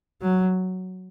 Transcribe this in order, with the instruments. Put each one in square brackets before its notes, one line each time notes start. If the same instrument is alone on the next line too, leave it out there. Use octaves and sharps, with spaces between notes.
[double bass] F#3